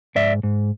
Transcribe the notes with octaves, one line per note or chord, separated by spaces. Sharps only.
G#2 D5 E5
G#2